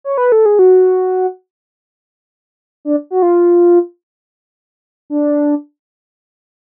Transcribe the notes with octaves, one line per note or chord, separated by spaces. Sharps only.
C#5
B4
A4
G#4
F#4
D4
F#4
F4
D4